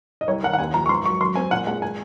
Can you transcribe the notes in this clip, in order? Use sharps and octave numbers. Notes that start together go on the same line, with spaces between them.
D#5
C2 C#5
D#3 F#5
F#5
D#2 G#5
F3 A#5
C#6
G#2 C6
F#3 C#6
F#2 C6
C4 G#5
A#2 F#5
G#3 F#5
G#5